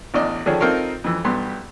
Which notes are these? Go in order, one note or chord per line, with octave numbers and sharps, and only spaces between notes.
A1 E2 D4 D5 D#5
D3 D#3 F3 C#4 D4 G#4
C4 D#4 F4 A4 A#4 C#5
F2 E3
B1 G2 B3 G4 C6